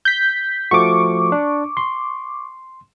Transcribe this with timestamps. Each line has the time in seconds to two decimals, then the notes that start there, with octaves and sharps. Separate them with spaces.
0.05 G6 B6
0.71 F3 A3 F#4 C#6 D6
1.32 D4
1.77 C6